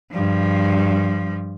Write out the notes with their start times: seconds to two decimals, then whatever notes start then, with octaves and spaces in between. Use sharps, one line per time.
0.12 G2 F3